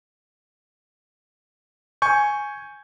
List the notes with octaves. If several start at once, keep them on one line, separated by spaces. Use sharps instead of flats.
G#5 C#6 G6